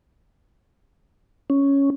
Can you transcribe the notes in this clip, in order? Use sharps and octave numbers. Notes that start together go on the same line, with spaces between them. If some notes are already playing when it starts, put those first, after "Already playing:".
C#4